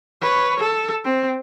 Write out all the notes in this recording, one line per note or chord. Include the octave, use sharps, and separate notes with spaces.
B4 C#5
A4
C4